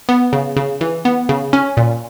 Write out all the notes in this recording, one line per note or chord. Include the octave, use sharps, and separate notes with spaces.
B3
C#3
C#3
E3
B3
C#3
C#4
A#2